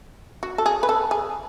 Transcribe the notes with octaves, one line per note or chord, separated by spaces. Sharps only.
F#4
A4
G#4
B4
A4
G#4